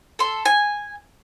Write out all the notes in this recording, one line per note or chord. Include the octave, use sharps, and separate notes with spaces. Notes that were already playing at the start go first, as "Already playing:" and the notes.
A4 C6
G#5